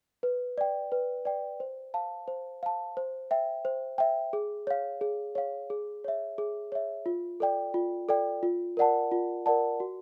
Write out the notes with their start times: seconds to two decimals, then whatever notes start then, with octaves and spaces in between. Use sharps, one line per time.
0.23 B4
0.58 D5 G5
0.92 B4
1.25 D5 G5
1.60 C5
1.94 F5 A5
2.28 C5
2.63 F5 A5
2.97 C5
3.31 E5 G5
3.65 C5
3.98 E5 G5
4.33 G#4
4.67 C#5 F5
5.01 G#4
5.35 C#5 F5
5.70 G#4
6.04 C#5 E5
6.38 G#4
6.72 C#5 E5
7.06 F4
7.40 A4 D5 G5
7.74 F4
8.09 A4 D5 G5
8.43 F4
8.77 A#4 D5 F#5 A5
9.11 F4
9.46 A#4 D5 F#5 A5
9.80 F#4